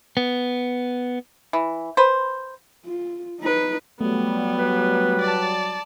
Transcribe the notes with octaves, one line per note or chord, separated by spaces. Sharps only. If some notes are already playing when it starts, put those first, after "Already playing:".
B3
E3
B4 C5
F4
D#4 B4
F#3 G3 A3 B3
B4
D5 A5